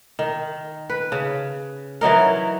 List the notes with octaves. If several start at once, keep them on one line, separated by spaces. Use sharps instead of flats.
D#3
B4
C#3
E3 F#3 D#4 A#4